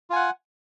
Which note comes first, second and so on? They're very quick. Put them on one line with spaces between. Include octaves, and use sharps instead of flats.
F4 G#5 F#5